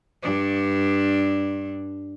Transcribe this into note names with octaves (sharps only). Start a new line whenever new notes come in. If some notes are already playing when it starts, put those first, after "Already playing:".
G2 D4